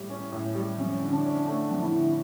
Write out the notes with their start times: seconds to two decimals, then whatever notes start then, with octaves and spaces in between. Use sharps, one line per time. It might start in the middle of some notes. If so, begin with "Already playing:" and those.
Already playing: A2 G3 G4
0.10 C#4
0.32 A2
0.55 G3
0.78 F2 C#4
1.02 D3
1.12 D4
1.25 C#4
1.48 A3 D4
1.71 F2
1.83 E4
1.94 D3